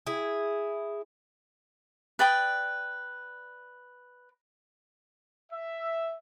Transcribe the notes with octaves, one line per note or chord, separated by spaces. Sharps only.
E4 G#4
B4 D5 G5 D#6
E5